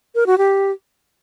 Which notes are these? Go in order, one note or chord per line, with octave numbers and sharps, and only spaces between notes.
A#4
F#4
G4